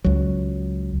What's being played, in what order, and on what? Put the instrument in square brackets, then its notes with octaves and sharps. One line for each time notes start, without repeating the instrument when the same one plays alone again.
[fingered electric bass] C#2 F#3